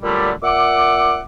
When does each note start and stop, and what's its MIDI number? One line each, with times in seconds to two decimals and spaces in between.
0.03 0.31 46
0.03 0.31 50
0.03 0.31 54
0.03 0.31 55
0.03 0.31 57
0.43 1.20 46
0.43 1.20 76
0.43 1.20 78
0.43 1.20 86